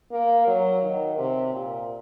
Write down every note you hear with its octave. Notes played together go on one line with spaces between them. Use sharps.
A#3
F#3
D#3
C3
A#2